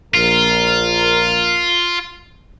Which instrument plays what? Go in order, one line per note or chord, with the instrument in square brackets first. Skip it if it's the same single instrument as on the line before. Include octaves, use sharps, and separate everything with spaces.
[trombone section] A#1 A#4 [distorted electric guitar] F4